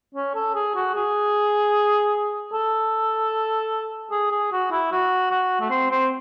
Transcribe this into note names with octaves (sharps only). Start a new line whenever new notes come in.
C#4
A4
G#4
F#4
G#4
A4
G#4
G#4
F#4
E4
F#4
F#4
A3
C4
C4